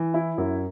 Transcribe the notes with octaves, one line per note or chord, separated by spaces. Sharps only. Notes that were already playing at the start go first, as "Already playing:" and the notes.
Already playing: E3
E4
F#2